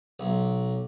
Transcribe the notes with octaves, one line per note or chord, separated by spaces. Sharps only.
B1